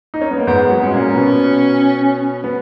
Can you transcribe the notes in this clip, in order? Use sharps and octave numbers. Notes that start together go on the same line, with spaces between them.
D#4
C#4
B3
A#3
G#2 G#3 B3
F#3
G#3 C#4
A#2 A#3
B2 B3
B3